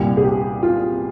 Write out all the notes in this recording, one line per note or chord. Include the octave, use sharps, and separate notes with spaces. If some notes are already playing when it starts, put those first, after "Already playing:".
Already playing: C2 A#2 G3 G4
G#4
G4
F4